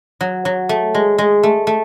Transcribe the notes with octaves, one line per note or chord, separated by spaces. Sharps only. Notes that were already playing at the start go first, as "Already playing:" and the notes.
F#3
F#3
A3
G#3
G#3
A3
A3